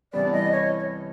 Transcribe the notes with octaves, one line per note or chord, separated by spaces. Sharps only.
C2 C3 E3 G3 B3 D5
D#5
C#5